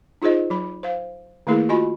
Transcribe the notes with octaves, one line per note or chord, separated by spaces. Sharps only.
D#4 F4 G#4 C5 D#5
F#3 B5
C5 F5
D#3 A3 A#3 E4 G#4 A#4
F4 F#4 D#5 G#5 B5